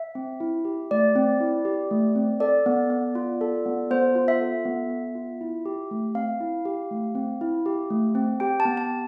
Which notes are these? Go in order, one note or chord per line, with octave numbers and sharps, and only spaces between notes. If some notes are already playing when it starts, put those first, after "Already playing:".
Already playing: E5
C4
E4
G4
A3 D5
C4
E4
G4
A3
C4
A4 D5
B3
B3
F4
A4
B3
B3 C5
F4
E5
A4
B3
B3
F4
E4
G4
A3
C4 F5
E4
G4
A3
C4
E4
G4
A3
C4
G4 G5
A5
B3
A5
B3